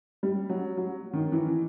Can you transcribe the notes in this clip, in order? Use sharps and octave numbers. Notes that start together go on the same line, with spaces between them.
G3
F#3
F#3
D#3
E3